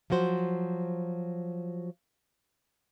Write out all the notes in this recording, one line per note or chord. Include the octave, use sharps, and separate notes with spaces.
F3 F#3 F#4 C5